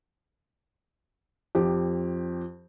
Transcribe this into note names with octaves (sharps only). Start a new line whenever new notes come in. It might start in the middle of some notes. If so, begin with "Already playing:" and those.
F2 G4